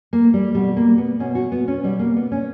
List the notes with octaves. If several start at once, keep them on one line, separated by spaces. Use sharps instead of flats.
A#3
G3
B2 G3
A#3
B3
B2 C#4
F#4
B3
C#4
B2 G3
A#3
B3
C#4